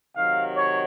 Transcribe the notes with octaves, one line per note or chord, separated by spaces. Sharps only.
C3 D#3 F#3 F5
C#5